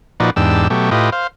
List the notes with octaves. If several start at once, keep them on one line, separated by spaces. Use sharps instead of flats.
A#2 F3 D#4 F#4 B4 D5
E2 G#2 D4 G4 E6
B2 F#3 A3 G4
A2 F4 G4 B4 D#5
C5 F5